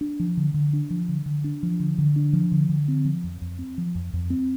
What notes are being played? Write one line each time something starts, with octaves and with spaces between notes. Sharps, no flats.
D4
F3
D3
D3
D4
F3
D3
D3
D4
F3
D3
D3
D4
F3
D3
D3
C4
F3
F2
F2
C4
F3
F2
F2
C4